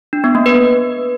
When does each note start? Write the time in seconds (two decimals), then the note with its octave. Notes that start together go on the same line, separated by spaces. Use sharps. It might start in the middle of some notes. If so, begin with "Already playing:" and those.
0.13 D4
0.24 B3
0.35 A#3
0.46 B4